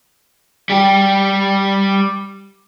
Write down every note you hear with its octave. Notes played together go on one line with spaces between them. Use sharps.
G3 G4